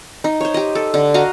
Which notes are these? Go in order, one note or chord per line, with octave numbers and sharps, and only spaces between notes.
D#4
C5 C#5
G4 D#5
A4
D3
F#4 D#5 F5 A#5